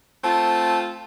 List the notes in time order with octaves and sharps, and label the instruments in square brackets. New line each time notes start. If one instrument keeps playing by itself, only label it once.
[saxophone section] A3 C4 F4 [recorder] A5